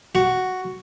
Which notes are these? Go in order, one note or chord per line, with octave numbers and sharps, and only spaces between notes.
F#4